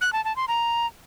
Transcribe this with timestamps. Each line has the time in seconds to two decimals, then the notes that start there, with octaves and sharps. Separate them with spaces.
0.01 F#6
0.13 A5
0.25 A5
0.36 C6
0.48 A#5